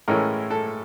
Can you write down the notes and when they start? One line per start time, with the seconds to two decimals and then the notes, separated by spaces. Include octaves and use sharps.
0.08 A2 E3 G#3 C#4 E4 A#4
0.51 A4